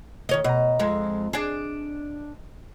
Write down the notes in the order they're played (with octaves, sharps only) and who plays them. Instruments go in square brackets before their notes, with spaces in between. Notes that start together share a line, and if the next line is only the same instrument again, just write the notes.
[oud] D#3 C#5 D#5
[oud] B2 [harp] D#5 A#5
[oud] F2 G#3
D4 G#4